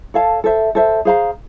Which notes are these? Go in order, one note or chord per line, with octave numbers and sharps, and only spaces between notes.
A4 C#5 F5 A5
A4 C5 E5
A4 C5 E5
G#4 C5 F5 A#5